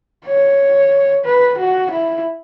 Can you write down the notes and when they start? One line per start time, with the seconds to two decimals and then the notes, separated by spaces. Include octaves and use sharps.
0.26 C#5
1.25 B4
1.58 F#4
1.91 E4